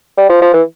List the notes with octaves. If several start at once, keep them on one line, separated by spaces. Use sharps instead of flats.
G3
F3
F3
E3